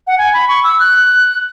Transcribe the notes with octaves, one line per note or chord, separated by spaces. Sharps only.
F#5
G#5
B5
C#6
E6
F#6